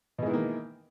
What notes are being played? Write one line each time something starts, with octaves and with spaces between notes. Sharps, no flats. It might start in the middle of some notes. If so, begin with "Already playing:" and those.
B2 D#3 E3 G#3 A#3